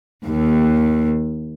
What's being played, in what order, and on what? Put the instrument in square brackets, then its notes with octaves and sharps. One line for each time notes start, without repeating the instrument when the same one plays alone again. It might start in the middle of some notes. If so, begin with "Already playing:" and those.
[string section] D#2